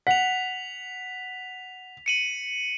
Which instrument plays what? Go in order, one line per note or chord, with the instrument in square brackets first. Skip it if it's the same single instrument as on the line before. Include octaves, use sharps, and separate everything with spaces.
[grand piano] F#5 [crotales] B6 F7
[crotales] C#7 D#7 F#7